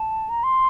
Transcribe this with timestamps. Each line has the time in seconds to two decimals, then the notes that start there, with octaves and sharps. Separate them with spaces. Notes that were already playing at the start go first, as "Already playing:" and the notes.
Already playing: A5
0.29 A#5
0.44 C6